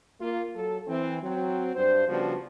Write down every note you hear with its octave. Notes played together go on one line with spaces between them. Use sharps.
A#3 F4
F#3 A4
E3 C4
F#3 C4
G2 C5
C#3 F3 G3 B3 D4 F#4